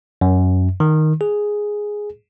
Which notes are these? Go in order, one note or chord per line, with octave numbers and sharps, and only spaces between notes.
F#2
D#3
G#4